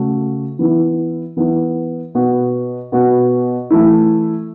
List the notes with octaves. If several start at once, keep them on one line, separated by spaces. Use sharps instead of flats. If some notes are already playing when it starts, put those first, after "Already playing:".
Already playing: C#3 A3 F#4
E3 B3 E4
E3 B3 E4
B2 B3 F#4
B2 B3 F#4
E3 A3 E4